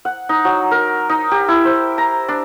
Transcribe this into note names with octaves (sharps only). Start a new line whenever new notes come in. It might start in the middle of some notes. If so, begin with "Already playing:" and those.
F#5
D#4
F#3
A#4
D#4
G4
E4
C5
A#5
D4